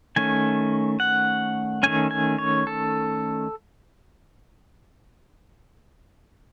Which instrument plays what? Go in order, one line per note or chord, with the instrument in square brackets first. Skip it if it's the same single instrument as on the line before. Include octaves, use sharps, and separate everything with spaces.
[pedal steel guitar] D#3 A3 C#4 G#5
F#5
D#3 A3 C#4 G#5
G#5
C#5
A4